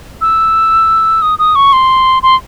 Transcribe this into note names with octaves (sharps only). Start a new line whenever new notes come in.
E6
D#6
D#6
C#6
C6
C6